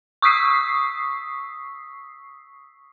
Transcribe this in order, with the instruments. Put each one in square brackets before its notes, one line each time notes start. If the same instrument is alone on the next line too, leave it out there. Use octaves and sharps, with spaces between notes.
[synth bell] C#6 D#6 E6 B6 C7